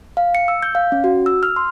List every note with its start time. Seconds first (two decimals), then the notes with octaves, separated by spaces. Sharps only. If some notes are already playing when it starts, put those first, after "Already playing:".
0.17 F5
0.35 C#7
0.48 E6
0.63 G6
0.75 F5
0.92 C#4
1.04 F#4
1.26 E6
1.43 F6
1.56 C6